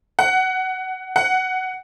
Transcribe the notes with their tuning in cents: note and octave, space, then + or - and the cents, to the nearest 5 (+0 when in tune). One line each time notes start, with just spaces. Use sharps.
F#5 +15
F#5 +10